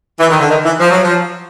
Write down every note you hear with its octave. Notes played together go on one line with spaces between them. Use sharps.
E3
D#3
D3
D#3
E3
F3
F#3
F3